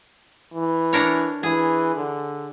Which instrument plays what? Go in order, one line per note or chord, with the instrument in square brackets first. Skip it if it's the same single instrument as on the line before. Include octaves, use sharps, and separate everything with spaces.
[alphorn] E3
[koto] D4 A#4 C#5
[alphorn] E3 [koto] G#4
[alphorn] D3